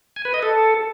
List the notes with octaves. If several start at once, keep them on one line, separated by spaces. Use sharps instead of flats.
G#5
B4
D#5
A4